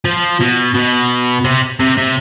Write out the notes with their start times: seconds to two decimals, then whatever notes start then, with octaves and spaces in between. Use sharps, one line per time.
0.05 F3
0.41 B2
0.75 B2
1.45 C3
1.79 C3
1.97 C3